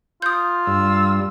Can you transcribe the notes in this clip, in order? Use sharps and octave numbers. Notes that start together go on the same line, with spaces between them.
F4 D#6 G6
G2 E6